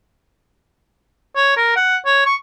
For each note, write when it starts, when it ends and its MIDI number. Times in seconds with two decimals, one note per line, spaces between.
1.36 1.56 73
1.57 1.72 70
1.76 1.97 78
2.06 2.23 73
2.26 2.35 85